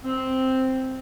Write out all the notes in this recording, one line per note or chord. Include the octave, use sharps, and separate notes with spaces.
C4